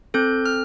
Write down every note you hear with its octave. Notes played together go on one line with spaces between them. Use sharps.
C4 A4 G6
F6